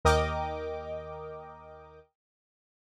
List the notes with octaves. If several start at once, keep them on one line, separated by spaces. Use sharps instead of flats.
D#2 A#4 D#5 G5 D6